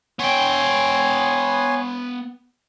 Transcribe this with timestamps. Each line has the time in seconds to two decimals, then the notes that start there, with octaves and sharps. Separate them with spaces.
0.19 B3 C#5 G5 G#5 C6